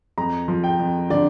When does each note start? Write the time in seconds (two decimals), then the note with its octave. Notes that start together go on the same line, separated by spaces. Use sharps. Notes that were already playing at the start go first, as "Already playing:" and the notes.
0.18 F2 A#5
0.48 F3
0.64 G5
0.79 F2
1.10 D3 D5